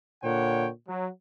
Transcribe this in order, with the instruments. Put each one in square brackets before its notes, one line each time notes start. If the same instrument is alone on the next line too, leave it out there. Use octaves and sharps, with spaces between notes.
[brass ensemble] A#2 D3 C#5 F#5 G5
F#3